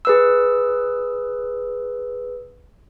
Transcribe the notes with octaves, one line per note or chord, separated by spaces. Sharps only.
G#4 B4 E6